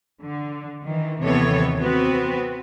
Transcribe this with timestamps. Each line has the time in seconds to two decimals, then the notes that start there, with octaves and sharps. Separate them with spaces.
0.22 D3
0.81 D#3 E3
1.22 D#2 C3 E3 B3 A4 C#5
1.79 B3 C4 F#4 B4